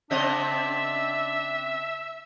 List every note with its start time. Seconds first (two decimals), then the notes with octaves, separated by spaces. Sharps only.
0.11 C#3 C4 D4 D#5 E5